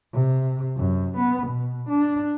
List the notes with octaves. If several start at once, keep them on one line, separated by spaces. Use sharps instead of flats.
C3
F#2
B3
B2
D4